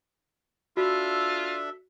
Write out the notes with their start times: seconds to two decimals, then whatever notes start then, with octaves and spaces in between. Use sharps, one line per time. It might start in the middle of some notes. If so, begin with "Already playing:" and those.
0.77 D4 F4 F#4 A4 E5